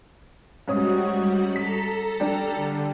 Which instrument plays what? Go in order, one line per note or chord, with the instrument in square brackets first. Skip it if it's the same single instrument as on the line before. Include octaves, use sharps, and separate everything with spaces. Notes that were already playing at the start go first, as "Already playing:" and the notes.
[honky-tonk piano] G#2 C#4 D#6 [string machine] G3 F#4
[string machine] A4 A#5 [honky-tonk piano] B6
[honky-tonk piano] G3 D4 G4
[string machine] D3